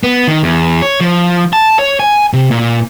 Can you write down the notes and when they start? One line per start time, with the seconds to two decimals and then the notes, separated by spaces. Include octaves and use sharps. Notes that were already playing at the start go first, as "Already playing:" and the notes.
0.03 B3
0.28 D#3
0.43 E2
0.82 C#5
1.01 F3
1.53 A5
1.79 C#5
1.99 G#5
2.33 C3
2.51 A#2